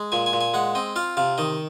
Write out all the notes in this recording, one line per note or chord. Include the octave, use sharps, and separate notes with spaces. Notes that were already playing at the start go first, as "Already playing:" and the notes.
Already playing: G#3
A#2 G#5
G#5
A#2
G#5
G#3 F#5
C4 D#5
F4 F5
C3 F5
D#3 D#5